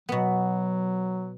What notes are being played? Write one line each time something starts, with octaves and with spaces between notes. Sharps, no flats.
B2 F#3 B3